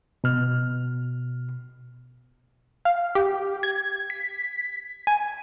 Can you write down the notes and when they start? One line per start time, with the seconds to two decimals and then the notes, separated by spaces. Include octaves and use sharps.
0.24 B2 F6
2.85 F5
3.15 G4
3.63 G#6
4.10 B6
5.07 G#5